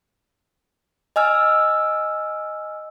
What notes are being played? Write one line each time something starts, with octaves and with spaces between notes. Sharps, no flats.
D#5 G#5 E6 F6